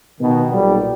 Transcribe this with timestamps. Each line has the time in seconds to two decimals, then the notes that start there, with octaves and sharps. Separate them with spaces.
0.20 B2 D#3
0.50 B1 A#2 G3